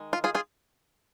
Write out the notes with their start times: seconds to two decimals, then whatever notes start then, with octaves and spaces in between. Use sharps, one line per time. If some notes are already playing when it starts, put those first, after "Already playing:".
Already playing: D#3 G#3
0.13 F4
0.24 F4 G#4
0.35 F4 G#4